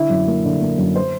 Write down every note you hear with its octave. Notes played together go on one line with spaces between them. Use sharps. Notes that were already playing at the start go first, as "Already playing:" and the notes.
Already playing: D3 E4 E5
F#2
A#3
D3
A#3
F#2
C5